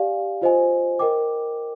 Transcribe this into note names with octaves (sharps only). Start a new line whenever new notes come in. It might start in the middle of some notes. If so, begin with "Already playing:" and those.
Already playing: G4 D5 F5 G#5
F4 C5 D#5 G#5
A#4 D#5 G5 D6